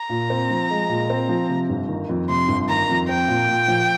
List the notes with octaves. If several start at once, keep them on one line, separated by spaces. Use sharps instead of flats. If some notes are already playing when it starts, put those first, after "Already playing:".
Already playing: A#5
A#2
C4
F3
G#3
A#2
C4
F3
C3
G1
D#3
F2
C3 C6
G1
D#3 A#5
F2
C4 G5
A#2
A#2
F3